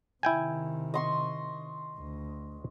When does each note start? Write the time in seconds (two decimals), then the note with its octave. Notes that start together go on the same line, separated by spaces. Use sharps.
0.23 C3 D#3 E4 G5 G#5
0.94 D#5 C6 C#6
1.97 D2